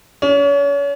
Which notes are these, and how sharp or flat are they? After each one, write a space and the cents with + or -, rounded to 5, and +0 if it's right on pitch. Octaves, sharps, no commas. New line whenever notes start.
C#4 +35